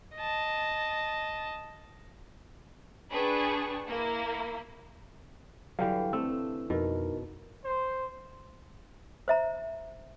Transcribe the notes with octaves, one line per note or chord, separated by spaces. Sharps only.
D#5 A5
D4 G#4 B4 G5 A5 C#6
A#3 E4
G2 D3 E3 F#3 F5 G5
A3 C4 E6
F2 B2 D#4 A#4
C5
C5 E5 A#5